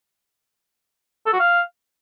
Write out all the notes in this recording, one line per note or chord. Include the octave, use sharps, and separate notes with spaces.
A4
F#4
F5